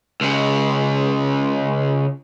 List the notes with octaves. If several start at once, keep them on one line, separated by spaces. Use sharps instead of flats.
C#2 C#3